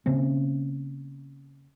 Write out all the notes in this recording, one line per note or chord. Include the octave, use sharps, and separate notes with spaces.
C#3 A#3 C4 C#4